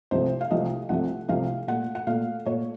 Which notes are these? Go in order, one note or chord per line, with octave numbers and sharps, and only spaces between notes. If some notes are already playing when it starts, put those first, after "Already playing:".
C2 C3 F3 A3 C5
F5
C2 C3 F3 A3 D#5
C2 C3 F3 A3 F#5
C2 C3 F3 A3 F5
A#2 A3 F#5
F#5
A#2 A3 F5
A#2 A3 C#5